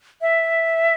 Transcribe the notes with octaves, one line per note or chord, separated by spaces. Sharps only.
E5